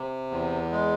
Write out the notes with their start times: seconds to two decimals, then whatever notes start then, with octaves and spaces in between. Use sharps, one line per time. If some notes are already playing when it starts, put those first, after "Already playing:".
Already playing: C3
0.31 E2
0.72 G#3